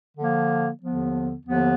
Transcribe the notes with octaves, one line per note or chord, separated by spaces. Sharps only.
D3 F3 A#3
D#2 D3 F3 B3
D#2 D3 F3 B3